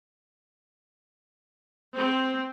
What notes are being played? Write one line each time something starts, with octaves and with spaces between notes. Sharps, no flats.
C4